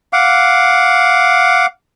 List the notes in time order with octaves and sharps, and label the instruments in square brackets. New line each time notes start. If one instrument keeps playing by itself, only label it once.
[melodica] F5 F#5 D6